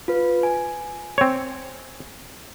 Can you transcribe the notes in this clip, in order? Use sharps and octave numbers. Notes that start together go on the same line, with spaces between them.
F4 B4
G#5
C4 C#5